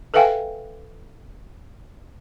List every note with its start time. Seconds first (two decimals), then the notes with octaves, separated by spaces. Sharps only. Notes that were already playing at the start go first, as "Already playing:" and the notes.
0.14 A4 B4 E5 F5 G5 G#5